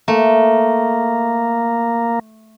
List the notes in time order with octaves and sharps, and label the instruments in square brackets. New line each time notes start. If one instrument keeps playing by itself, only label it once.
[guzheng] A3 [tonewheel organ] A#3